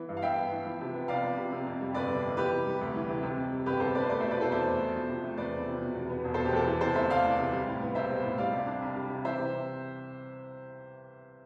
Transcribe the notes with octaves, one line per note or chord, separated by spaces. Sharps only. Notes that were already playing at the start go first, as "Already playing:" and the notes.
Already playing: E3 B3
G2
F5
G2 E5 G5
B3
E3
F3
C3
B3
C2 D5 F5
F3
C3
C3
F2
G3
G1 B4 D5
C3
F2
E3 G4 B4
C3
G3
D2
E3
C3
C3
F2
G3
G1 G4 B4
C3 A4 C5
F2 B4 D5
C5
A3 B4 D5
B2 C5 E5
B4 D5
E4 A4 C5
E2 C5 E5
A3
B2
F3
C3
A3
E2 B4 D5
F3
C3
B2
E2
B3
E1
B2 A4 C5
G4
E2 A4
E3 A4
C3 A4 C5
D2 C5 E5
D2 D5 F5
E3
C3
G3
A2
B3
B1 C5 E5
G3
A2
G3 D5 F5
C3
D4
C2
G3
C3
E3 C5 E5
C3